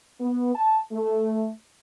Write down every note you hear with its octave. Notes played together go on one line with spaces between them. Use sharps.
B3
A5
A3